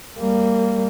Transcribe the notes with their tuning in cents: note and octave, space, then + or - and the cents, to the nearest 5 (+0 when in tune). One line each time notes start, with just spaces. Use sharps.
G3 +0 A#3 -20